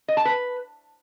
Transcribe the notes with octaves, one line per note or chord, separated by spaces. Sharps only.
D#5
A5
B4